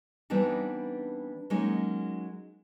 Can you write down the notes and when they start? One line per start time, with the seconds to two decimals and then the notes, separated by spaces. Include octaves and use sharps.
0.30 E3 G3 B3 C4 D4 D#4
1.50 F#3 G#3 A#3 C#4 D#4